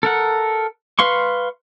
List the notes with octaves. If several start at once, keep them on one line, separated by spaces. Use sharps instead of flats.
A4 A#4 F#5
B4 F5 C6 C#6